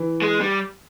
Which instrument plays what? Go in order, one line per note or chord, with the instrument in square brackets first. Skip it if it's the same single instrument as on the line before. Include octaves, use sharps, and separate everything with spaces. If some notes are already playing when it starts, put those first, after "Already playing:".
Already playing: [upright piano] E3
[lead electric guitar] G#3
G3